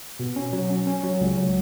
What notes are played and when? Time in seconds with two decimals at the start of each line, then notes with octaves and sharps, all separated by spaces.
0.19 B2
0.36 C#4
0.53 F#3
0.70 C#4
0.87 C#4
1.03 F#3
1.21 C#2
1.37 F#3